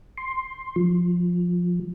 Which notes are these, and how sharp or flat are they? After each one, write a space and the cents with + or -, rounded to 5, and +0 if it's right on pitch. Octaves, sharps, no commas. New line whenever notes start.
C6 +10
F3 +15